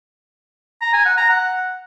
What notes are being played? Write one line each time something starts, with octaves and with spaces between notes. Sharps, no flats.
A#5
G#5
F#5
A#5
F#5